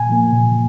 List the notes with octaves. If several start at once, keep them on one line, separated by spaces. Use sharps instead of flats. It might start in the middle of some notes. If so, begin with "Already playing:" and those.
Already playing: A#2 G#5
F3 A#3
A#2